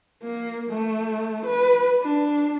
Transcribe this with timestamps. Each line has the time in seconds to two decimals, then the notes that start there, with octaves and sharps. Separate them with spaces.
0.23 A#3
0.70 A3
1.46 B4
2.02 D4